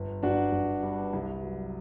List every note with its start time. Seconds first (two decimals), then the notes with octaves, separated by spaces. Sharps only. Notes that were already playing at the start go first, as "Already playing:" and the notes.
Already playing: G1
0.23 G1 D4 F#4
0.52 G1
0.83 G2
1.13 C2
1.43 F#3